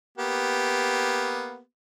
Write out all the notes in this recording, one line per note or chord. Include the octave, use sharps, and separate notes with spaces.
A#3 B3 G4